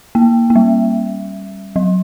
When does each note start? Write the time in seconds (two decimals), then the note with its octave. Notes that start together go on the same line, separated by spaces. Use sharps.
0.15 A#3
0.50 A#3
0.56 G3
1.76 F#3